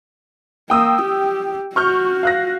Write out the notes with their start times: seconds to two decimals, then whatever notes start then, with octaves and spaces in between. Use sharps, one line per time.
0.70 A#3 G5 D#6 E6
1.02 G4
1.76 F#4 C#6 F6 G6
2.23 F5 F#6 A#6